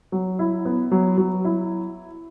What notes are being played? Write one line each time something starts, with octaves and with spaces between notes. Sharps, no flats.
F#3
E4
B3
F#3
F#3
E4